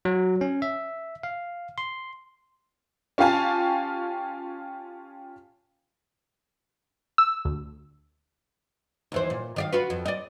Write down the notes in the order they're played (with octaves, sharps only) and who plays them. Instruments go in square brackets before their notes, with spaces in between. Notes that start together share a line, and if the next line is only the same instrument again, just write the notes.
[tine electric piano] F#3
C#4
E5
F5
C6
[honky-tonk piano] C#4 F4 G4 F5 G#5 A5
[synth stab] E6
D2
[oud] D#2 E3 C5
A#2
D#3 D5 F5
F4 F#4 B4
F2
D5 D#5